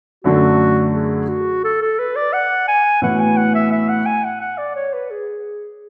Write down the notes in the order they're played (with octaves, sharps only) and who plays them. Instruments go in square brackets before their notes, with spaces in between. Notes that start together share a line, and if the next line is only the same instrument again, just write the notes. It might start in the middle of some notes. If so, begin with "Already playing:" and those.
[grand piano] F#2 D3 A3 D4 A4 [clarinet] F#4
[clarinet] G#4
F#4
A4
A4
B4
D5
F#5
G#5
[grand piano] A2 E3 B3 F#4 [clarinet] F#5
[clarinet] G#5
F#5
E5
E5
F#5
G#5
F#5
F#5
D5
C#5
B4
G#4